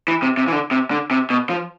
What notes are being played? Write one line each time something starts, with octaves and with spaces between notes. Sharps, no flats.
E3
C3
C3
E3
D3
C3
D3
C3
B2
F3